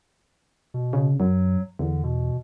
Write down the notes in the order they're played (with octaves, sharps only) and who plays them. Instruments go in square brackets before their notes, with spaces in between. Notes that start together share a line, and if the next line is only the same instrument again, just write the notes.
[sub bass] B2
[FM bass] C#3
[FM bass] F#2 [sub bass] F#3
[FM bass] E2 [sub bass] D3
[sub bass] B2